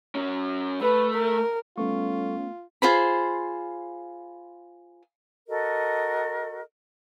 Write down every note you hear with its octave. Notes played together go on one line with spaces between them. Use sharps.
F#3 C#4
A3 B4
A#4
G3 A3 B3 C#4 F4 A4 C#6
F4 G#4 C5 B5
F#4 A4 A#4 D#5